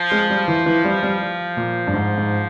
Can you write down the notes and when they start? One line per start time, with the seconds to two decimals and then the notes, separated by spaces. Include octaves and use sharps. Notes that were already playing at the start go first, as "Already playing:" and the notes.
Already playing: F3
0.12 G#3
0.30 G3
0.48 E3
0.66 E3
0.85 G3
1.03 G3
1.57 A#2
1.87 G2
1.94 G#2
2.18 G#2